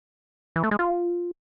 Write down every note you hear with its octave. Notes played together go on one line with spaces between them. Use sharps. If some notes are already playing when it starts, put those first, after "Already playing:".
E3
A3
G#3
F4